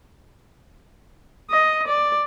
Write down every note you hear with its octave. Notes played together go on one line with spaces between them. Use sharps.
D#5
D5